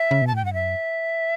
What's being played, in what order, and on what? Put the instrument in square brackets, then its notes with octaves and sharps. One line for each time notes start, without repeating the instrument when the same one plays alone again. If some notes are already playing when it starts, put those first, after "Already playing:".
Already playing: [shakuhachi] E5
[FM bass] C#3
B2
[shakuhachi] A5
[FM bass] A2 [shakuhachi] G5
[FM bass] G2 [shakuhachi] F#5
[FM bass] F#2 [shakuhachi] E5